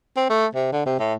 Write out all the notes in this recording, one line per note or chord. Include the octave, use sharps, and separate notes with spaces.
C4
A3
C3
D3
C3
A2